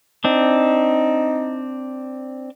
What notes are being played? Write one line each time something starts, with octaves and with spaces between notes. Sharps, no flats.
C4 D4 D#4